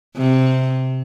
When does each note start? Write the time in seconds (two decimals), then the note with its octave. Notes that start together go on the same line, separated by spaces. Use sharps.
0.17 C3